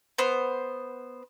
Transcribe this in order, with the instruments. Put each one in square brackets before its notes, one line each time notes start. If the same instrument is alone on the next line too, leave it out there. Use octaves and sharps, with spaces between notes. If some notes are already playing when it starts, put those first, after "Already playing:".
[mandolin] B3 C5